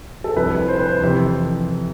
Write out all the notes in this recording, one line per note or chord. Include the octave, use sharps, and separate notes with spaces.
A4
C2 C3 F3 B4
C5
B4
C5
F2 C3 E3